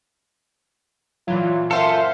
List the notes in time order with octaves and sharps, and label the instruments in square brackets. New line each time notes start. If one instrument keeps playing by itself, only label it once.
[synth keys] A#2 E3 F#3 [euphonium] F4
[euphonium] F#2 [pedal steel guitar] F4 A4 [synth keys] C5 F5 [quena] E5